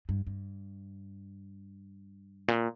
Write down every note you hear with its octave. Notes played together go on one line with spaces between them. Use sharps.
G2
G2
A#2